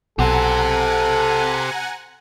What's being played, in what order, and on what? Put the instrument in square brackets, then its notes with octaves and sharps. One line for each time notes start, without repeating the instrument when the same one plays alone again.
[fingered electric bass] B1 [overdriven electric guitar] G4 C5 [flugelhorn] A4 [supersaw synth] F#5 G#5 A#5